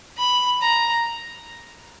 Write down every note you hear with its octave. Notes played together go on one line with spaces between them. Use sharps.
B5
A#5